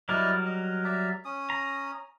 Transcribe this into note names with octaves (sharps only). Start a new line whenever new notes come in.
F#3 G3 E4 A#4 D5 D#5
D#5
D5 E5 A#5
C#4 D#6
A#5